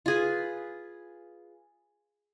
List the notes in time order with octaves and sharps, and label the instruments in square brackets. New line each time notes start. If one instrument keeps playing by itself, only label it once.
[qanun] F4 G#4 B4